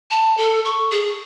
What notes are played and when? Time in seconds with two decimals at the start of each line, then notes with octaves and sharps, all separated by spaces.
0.11 A5
0.37 A4
0.65 C#6
0.91 G#4